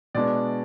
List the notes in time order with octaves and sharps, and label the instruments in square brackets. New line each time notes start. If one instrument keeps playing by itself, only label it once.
[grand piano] B2 G#3 B3 D4 D5